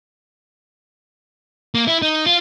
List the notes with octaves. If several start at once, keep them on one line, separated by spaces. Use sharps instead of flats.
A#3
E4
D#4
F4